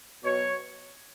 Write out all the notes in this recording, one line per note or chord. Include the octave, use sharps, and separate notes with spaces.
B2 F#3 C#5